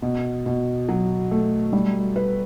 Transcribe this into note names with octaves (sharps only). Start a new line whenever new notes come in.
B2
B2
F#3
A3
G3
B4